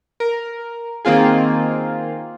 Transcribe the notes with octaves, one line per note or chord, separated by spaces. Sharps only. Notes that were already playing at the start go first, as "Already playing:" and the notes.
A#4
D#3 A#3 C4 F4 G#4